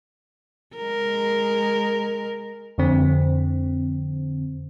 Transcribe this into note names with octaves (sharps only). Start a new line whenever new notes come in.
G#3 A#4
F2 D3 C4